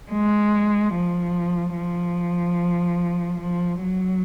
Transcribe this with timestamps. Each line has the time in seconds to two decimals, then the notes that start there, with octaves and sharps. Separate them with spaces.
0.12 G#3
0.95 F3
1.77 F3
3.41 F3
3.84 F#3